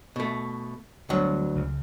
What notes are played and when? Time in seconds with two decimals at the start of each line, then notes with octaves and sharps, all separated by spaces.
0.16 B2 A3
1.10 D2 F#3 G3 B3
1.56 C#2 C#3